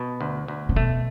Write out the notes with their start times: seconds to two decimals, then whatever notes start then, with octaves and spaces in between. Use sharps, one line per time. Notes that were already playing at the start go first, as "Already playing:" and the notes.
Already playing: B2
0.21 D2
0.48 D2
0.69 C#3
0.76 B2 A3